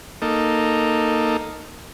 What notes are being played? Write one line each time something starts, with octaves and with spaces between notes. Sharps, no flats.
A#3 D#4 A4